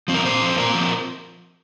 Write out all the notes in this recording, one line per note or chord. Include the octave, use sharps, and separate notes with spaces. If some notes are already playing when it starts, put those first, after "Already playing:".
F3 C4
A#4
A#2 C5
F3 C4
A#2 A#4
F3 C4